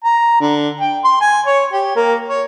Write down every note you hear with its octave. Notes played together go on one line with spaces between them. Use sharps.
A#5
D3
G5
C6
G#5
C#5
G4
A#3
C#5